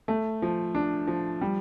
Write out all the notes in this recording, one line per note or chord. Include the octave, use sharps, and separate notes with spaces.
A3
F3
D4
F3
G3